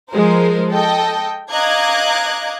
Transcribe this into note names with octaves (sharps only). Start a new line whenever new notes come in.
F3 G#3 A#4 C5
A4 D#5 G5
D#5 F5 A#5 D6 F#6 G#6